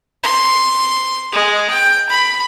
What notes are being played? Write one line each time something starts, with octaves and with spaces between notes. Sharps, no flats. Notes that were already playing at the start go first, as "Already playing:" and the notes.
C6
G#3
G5
B5